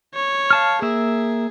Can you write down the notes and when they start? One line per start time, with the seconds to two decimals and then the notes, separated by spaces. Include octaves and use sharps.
0.15 C#5
0.51 F5 A5 F6
0.82 A#3 G#4 E5